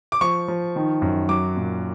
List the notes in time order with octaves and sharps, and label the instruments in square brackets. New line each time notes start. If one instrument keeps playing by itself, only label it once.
[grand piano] D6
F3 C#6
F3
D#3
F#2
F#3 D6
A#2